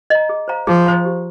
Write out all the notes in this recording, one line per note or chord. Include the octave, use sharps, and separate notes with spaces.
D#5 A#5
G#4
C5 F5 A#5
F3 G#4
C5 F5 A#5
G4